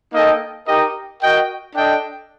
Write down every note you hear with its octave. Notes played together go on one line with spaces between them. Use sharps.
A#3 D#4 A4 D#5 G5
D#4 G4 A#4 D#5 G5
F#4 A#4 D#5 G5
D4 A4 D#5 G5